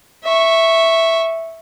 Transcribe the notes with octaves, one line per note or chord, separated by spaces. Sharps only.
E5 C#6